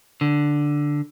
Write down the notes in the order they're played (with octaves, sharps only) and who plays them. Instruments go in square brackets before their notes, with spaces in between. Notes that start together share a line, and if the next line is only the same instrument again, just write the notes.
[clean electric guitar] D3